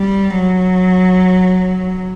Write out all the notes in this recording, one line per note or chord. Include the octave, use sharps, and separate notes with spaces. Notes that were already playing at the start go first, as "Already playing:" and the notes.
Already playing: G3
F#3